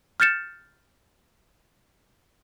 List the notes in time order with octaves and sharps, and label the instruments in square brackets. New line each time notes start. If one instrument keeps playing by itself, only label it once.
[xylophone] F6 G6 A6 C#7 E7